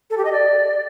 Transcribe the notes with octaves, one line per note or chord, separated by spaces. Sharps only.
A4
G4
D#5
D5